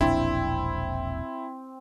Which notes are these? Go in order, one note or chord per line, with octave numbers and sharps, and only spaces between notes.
E1 A#1 C4 D4 E4